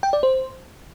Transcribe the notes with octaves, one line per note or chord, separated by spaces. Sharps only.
G5
D5
C5